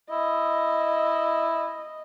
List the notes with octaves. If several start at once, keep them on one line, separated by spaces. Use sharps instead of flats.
E4 D#5